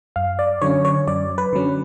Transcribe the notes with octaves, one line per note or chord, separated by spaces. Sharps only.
F#2 F5
D5
D3 F#3 C#4 C#5
C#5
F#2 D5
B4
D3 F#3 C#4